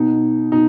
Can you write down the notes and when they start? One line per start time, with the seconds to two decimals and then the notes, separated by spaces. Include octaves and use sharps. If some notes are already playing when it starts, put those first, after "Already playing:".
Already playing: B2 D#4
0.52 B2 D#4